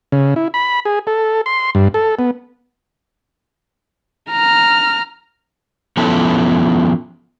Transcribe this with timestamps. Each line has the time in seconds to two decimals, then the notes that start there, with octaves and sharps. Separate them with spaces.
0.12 C#3
0.36 E4
0.54 B5
0.85 G#4
1.07 A4
1.46 C6
1.75 G2
1.94 A4
2.19 B3
4.31 A#5 F6
5.97 F3 B3 C#4 E4 A4